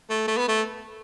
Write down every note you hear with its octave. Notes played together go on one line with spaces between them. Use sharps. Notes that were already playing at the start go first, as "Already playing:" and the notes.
A3
A3
B3
A3